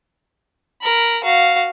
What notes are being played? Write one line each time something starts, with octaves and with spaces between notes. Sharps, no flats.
A#4 B5
F#4 F5